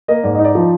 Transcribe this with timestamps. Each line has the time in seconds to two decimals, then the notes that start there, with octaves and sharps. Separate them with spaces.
0.08 A#3 D#5
0.24 G#2 D5
0.35 D#4 D#5
0.45 D5
0.55 F3